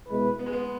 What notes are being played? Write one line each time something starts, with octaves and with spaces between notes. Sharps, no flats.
B2 G#3 E4 B4
B3
G#3
B3